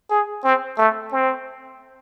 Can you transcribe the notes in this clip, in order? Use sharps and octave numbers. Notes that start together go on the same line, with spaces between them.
G#4
C4
A3
C4